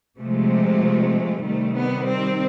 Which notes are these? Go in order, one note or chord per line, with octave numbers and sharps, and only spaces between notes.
C3 F3 G#3 A3
C3 D#3 G3 A3
B3
C4